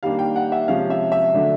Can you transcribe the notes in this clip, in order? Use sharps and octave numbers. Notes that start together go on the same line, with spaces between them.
D#3 G3 A#3 D4 F5
G5
F#5
E5
C3 F3 G#3 C#4 F5
E5
E5
D3 F#3 A3 D4